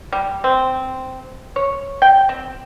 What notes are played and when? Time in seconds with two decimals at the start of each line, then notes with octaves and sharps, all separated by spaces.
0.12 G3
0.44 C4
1.56 C#5
2.02 G5
2.29 C4